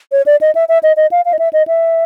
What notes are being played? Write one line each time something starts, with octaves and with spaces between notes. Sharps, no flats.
C#5
D5
D#5
E5
E5
D#5
D#5
F5
F5
D#5
E5
D#5
E5